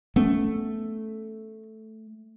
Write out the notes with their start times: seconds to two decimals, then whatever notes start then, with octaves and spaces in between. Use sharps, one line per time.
0.16 A3 B3 C#4